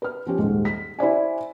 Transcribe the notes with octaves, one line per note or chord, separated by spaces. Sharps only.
B4 F6
F3 C#4 G4
D#1 G#2
B6
E4 C5 D5 G#5